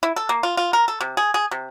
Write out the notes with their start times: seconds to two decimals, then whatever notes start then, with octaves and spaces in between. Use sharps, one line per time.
0.03 E4
0.16 A4
0.29 A#3
0.43 F4
0.57 F4
0.73 A#4
0.88 A4
1.00 C3
1.17 G#4
1.34 G#4
1.51 C3